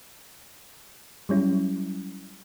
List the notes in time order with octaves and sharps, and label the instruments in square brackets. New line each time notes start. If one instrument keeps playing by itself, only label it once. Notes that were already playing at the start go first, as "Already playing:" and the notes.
[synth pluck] F#3 G3 C#4 E4